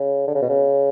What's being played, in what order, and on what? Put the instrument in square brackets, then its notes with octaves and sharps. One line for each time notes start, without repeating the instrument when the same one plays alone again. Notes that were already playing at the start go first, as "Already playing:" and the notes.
Already playing: [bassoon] C#3
D3
C#3
B2
C#3